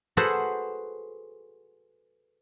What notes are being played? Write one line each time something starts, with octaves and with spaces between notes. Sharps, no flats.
F#4 G#4 A4 B4 C5 F#5